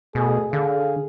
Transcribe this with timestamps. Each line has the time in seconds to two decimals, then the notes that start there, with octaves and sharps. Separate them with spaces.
0.15 B2 A3 G#4
0.53 D3 G#4 F5